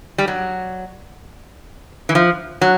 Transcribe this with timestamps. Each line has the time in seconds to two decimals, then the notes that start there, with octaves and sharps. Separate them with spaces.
0.18 G3
0.28 F#3
2.09 E3
2.15 F3
2.61 F#3